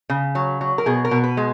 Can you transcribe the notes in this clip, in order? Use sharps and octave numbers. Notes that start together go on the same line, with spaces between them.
C#3
F#3
F#3
A#4
B2 G#4
A#4
B2
B4
G#3